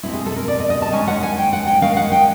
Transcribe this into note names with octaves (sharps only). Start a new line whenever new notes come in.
B2 G#3 C4 E4
G#4
A4
A#4
D5
D#5
D#5
A5
D#3 G#3 C#4 G#5
F#5
G#5
G5
F#5
G5
D#3 G#3 C#4 F5
F#5
G5